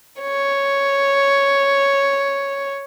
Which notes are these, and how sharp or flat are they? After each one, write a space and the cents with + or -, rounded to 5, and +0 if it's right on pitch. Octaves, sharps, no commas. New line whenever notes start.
C#5 +0